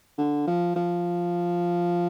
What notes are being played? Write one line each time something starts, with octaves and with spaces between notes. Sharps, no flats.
D3
F3
F3